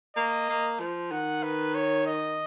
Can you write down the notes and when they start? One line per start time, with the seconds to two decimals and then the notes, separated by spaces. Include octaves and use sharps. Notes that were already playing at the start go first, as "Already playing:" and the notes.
0.16 A#3 D#5
0.49 A#3
0.80 F3
1.12 D#3 F#5
1.43 B4
1.75 C#5
2.07 D#5